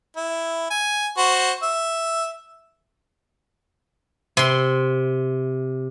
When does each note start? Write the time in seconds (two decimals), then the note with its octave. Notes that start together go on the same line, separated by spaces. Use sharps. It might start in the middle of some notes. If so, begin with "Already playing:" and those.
0.16 E4
0.70 G#5
1.17 F#4 C5
1.63 E5
4.37 C3 C6